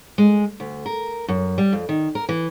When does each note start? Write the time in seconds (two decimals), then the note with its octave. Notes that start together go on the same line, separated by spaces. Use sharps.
0.18 G#3
0.60 D2
0.86 A#4
1.28 F#2
1.58 G3
1.73 F2
1.89 D#3
2.15 A#4
2.29 E3